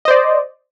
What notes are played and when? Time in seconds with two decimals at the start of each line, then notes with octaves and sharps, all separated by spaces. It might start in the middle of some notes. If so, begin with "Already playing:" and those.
0.05 D#5
0.08 C5
0.11 D5